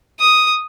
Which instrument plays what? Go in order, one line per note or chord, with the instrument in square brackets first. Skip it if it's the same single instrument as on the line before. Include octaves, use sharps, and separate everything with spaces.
[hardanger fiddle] D#6